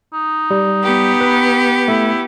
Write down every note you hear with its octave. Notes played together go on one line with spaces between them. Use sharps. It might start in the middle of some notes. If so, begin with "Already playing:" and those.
D#4
G3
B3 G4
B4
A3 E4